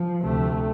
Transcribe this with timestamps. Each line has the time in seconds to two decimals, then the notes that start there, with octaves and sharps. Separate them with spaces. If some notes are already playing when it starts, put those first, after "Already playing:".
Already playing: F3
0.22 D2 C3 A3